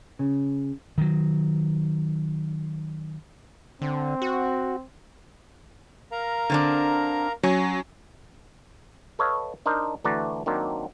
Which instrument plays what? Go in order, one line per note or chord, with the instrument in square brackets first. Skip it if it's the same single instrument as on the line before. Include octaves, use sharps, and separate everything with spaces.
[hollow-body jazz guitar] C#3
[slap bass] D#3 F#3
[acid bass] D3 [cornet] C4
[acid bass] F#4
[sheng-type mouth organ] A#4 F5 A#5
[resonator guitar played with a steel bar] D3 C4 D4
[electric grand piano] F#3 [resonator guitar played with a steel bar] C#4
[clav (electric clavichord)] A4 B4 C#5 D#5 F5
D4 D#4 A#4 C5
D2 E3 A3 D5 F#5 A#5
D#3 F#3 A#3 C4 D4